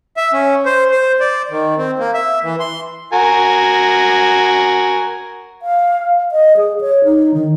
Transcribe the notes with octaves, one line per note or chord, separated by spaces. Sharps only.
E5
C#4
C5
C5
D5
D#3
C4
A#3
E5
E3
C6
F#4 A#4 G#5
F5
D#5
G#4
C#5
D#4
D#3